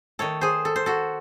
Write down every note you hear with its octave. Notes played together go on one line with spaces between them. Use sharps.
D#3 A3 A4 C#5
G#4 C5
A4
C5
F#4 A4